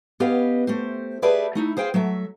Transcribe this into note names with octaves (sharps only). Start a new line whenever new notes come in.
B3 C#4 G4 B4 D#5 F5
A3 G4 C5
G4 G#4 B4 D5 E5 A5
A3 D#4 E4
G#4 C5 F5 G5
F#3 A3 E5